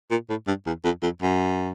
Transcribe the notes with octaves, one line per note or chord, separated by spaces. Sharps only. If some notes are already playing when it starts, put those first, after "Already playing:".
A#2
A2
G2
E2
F2
F2
F#2